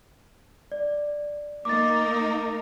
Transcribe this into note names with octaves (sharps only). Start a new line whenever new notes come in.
D5
A#3 D#4 A#4 D6 A6